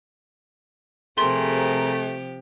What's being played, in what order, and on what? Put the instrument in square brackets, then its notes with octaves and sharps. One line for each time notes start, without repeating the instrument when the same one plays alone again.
[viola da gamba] C3 F3 G4 [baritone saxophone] A3 [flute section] G#4 A#4 A#5 [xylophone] C6